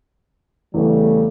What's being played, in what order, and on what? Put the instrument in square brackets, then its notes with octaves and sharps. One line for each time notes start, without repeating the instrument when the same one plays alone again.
[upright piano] E2 [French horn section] C#3 G3 A3